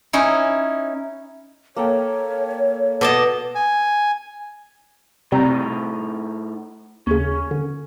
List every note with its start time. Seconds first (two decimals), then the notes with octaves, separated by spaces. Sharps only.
0.13 C#4 D#4 E4
1.76 A#3 A4 C#5 G5
3.01 B2 A4 B4 D5 D#5 A5
3.55 G#5
5.32 A2 C3 G3 C4 D#4 A#5
7.07 D#2 C#3 C#4
7.51 D3